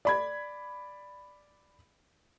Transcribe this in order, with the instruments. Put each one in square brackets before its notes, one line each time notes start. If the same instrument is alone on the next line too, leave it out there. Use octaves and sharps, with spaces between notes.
[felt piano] D5 B5 G#6